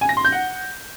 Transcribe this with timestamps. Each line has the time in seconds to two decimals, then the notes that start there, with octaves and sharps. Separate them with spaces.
0.01 G#5
0.09 A#6
0.17 C6
0.25 G6
0.32 F#5